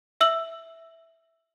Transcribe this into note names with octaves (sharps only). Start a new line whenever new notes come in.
E5 E6 F#7